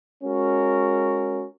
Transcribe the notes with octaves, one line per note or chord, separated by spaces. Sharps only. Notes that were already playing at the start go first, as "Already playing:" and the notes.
G#3 C#4 F#4 A#4